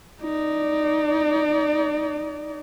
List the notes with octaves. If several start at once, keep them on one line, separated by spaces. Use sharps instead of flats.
D#4 D5